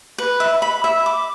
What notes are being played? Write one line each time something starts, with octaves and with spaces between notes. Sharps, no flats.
B4
E5
B5
E5
D6